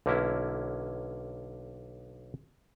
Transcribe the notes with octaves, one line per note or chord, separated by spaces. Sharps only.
B1 D3 A#3 C#4 E4